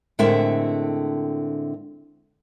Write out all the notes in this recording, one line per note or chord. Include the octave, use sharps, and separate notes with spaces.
A2 D3 G#3 C4 A#4 E5